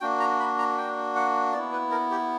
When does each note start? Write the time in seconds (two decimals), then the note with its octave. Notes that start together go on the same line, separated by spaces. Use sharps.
0.01 A#3 D4 F#4 G5
0.20 A#5
0.40 B5
0.59 A#5
0.78 G5
1.16 F#5
1.53 B3 E4 D5
1.72 B4
1.91 A#4
2.11 G4